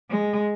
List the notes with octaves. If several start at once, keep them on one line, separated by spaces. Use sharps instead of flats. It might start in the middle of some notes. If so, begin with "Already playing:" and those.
G#3